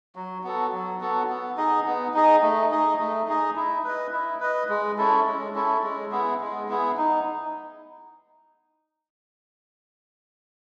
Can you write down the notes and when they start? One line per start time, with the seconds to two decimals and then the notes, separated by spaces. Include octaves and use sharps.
0.16 F#3
0.44 B3 F#4 A4
0.73 F#3
1.01 B3 F#4 A4
1.29 B3
1.57 D#4 G#4 D#5
1.85 B3
2.14 D#4 G#4 D#5
2.42 A3
2.71 D#4 G#4 D#5
2.99 A3
3.28 D#4 G#4 D#5
3.56 E4
3.85 B4 D#5
4.12 E4
4.40 B4 D#5
4.69 G#3
4.98 C#4 E4 A4
5.26 G#3
5.55 C#4 E4 A4
5.83 G#3
6.11 B3 E4 G#4
6.40 G#3
6.69 B3 E4 G#4
6.97 D#4